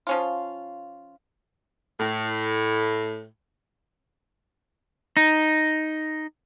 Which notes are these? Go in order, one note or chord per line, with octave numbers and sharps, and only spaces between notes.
F3 C#4 F4
A2
D#4